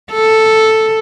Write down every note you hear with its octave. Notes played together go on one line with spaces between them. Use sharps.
A4